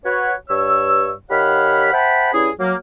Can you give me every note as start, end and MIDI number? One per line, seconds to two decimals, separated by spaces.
0.05 0.33 66
0.05 0.33 71
0.05 0.33 73
0.49 1.11 43
0.49 1.11 73
0.49 1.11 88
1.30 1.90 51
1.30 1.90 67
1.30 1.90 73
1.30 1.90 77
1.30 1.90 78
1.30 1.90 83
1.92 2.31 72
1.92 2.31 76
1.92 2.31 78
1.92 2.31 79
1.92 2.31 81
1.92 2.31 83
2.33 2.49 43
2.33 2.49 61
2.33 2.49 64
2.33 2.49 68
2.59 2.74 54
2.59 2.74 58